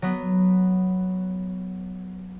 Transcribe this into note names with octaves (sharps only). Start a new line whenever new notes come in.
F#3 B3